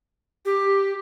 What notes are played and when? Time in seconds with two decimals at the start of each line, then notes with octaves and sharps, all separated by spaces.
0.45 G4